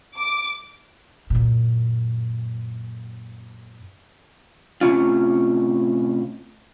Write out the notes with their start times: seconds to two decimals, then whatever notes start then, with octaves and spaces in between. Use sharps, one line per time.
0.16 D6
1.30 F#2 A#2
4.81 A2 C3 C#4 F4